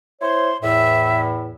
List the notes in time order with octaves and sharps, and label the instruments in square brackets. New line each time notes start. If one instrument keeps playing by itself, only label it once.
[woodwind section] E4 C5 C#5 [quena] C6
[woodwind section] E2 A2 [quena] E5